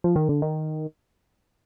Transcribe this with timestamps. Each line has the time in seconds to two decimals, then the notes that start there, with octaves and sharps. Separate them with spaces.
0.04 F3
0.16 D#3
0.29 D3
0.42 D#3